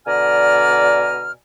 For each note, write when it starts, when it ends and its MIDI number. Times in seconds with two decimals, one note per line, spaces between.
0.07 1.32 47
0.07 1.32 50
0.07 1.32 74
0.07 1.32 80
0.07 1.32 82
0.07 1.32 89